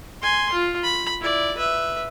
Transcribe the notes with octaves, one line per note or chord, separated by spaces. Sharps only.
G#5 C6
F4
B5
E4 D5
B4 E5